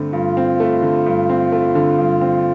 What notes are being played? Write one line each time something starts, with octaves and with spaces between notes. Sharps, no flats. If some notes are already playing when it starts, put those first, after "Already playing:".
Already playing: G2 D3 A3 C4
G2 F4
C4
A3
D3
G2
C4
A3
D3
G2
C4